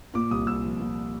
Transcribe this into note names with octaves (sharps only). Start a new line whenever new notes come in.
A#2 D6
C2 D#6
C2 E6
F3
A#2